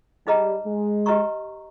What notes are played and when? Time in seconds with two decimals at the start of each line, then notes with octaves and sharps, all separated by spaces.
0.27 G3 D#4 G#4 B4 D#5 A#5
0.66 G#3
1.06 G4 B4 D#5 A#5 C#6